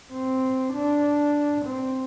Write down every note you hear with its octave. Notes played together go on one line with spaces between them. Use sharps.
C4
D4
C4